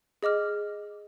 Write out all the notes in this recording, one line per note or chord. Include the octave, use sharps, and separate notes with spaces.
G#4 D#5 D6 F6